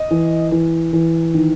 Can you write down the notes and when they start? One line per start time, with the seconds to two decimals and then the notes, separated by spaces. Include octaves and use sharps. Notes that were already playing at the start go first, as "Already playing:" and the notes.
Already playing: D#5
0.11 E3
0.52 E3
0.93 E3
1.34 D#3